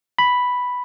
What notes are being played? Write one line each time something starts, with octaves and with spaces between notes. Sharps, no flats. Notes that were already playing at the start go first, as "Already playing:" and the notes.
B5